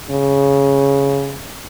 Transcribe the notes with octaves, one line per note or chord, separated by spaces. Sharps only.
C#3